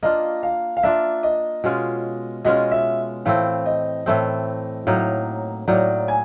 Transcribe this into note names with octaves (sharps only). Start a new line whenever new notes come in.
A#3 D4 F4 D#5
F5
F5
A#3 D4 F4 E5
D#5
B2 G#3 C#4 F4
B2 G#3 C#4 F4 D#5
E5
A2 E3 A3 C4 F5
D#5
A2 E3 A3 C4
A2 F#3 A#3 D#4
A2 F#3 A#3 D#4 D5
G#5